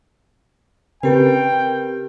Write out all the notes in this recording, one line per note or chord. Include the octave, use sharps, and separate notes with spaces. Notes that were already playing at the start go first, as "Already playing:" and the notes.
C#3 C4 G4 A#4 B4 G5